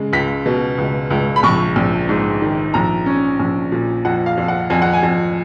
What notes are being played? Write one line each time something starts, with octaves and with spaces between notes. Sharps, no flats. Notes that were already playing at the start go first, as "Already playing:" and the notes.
Already playing: C#3 G#3
C#2 B6
B2
C#2
C#2
B5
A#1 C#6
A#1
G#2
D#3
A#1 A#5
C#4
A#1
A#2
F2 F#5
F5
F2
F#5
F2 G#5
F#5
G#5
F2